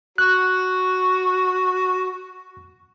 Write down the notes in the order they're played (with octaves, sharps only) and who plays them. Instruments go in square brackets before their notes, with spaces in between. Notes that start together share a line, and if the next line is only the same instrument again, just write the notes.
[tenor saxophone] F#4 [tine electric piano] F#6